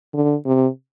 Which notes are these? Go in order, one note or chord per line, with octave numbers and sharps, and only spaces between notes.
D3
C3